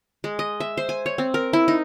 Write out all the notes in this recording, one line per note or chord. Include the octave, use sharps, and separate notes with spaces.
G#3
D#5
E5
C5
G#5
C#5
C4
A#4
E4
D#4